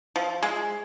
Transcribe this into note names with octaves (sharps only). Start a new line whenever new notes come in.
F3
G#3